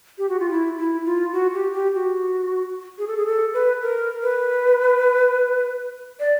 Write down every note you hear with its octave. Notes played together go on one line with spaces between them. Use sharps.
G4
F#4
F4
E4
E4
F4
F#4
G4
G4
F#4
G#4
A4
G#4
A4
B4
A#4
B4
D5